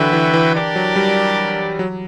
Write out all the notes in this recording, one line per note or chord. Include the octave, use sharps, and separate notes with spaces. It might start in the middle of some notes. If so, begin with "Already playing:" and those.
Already playing: D3 E3 F#3 F#4 B4 E5 G5
E3
E3
D4 G4 A#4 D5
F#3
G3
F#3